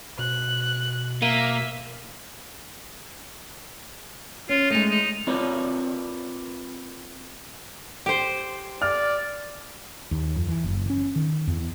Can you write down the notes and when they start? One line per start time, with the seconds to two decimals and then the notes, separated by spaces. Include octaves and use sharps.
0.19 B2 F#6
1.22 A#3 E5 D#7
4.49 C#4 F4
4.70 G#3 A3 D#4
4.91 D#4
5.27 C4 F4 A#4 B4 C#5 D5
8.06 G4 C5
8.82 D5 F6
10.11 D#2
10.36 F2
10.48 E3
10.64 F#1
10.90 C#4
11.16 D#3
11.47 E2